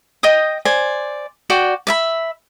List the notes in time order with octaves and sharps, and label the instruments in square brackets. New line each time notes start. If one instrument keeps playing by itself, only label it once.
[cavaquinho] D#5 G5 D#6
C5 D5 G#5
F#4 D5 G5
D5 E5 B5